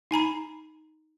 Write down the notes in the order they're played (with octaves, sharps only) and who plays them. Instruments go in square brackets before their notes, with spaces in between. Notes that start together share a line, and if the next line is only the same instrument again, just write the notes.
[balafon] D#4 G#5 A#5 B5